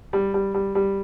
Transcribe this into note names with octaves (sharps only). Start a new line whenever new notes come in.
G3
G3
G3
G3